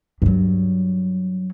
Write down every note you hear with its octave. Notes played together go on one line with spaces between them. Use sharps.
G2 F#3